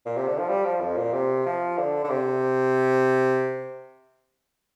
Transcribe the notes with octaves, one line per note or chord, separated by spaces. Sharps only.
A#2
C3
D3
F3
G3
F3
F2
A#2
C3
F3
D3
D3
C3